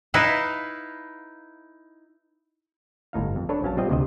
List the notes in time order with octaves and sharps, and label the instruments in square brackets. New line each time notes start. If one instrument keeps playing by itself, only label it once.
[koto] D#4 E4 B4 F5
[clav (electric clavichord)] G1 A2 D#4 F5
F2
D4 A4 B4 C#5
A#1 F#3 C#4 F5 A5
G3 B3 C4 F4 D#5 G5
D2 C3 C5 D#5